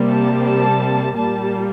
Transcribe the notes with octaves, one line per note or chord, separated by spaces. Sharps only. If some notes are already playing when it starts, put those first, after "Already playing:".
Already playing: C3 G3 A#3
A5
A5
A#2 G3 A#3 A5